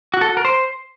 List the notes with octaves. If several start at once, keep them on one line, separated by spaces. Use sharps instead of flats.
F#4
A4
F#4
A#4
C5